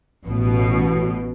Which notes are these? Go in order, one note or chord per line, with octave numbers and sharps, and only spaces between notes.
A1 B2